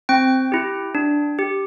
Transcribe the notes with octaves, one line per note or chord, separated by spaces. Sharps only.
C4 G5
E4 G4
D4
G4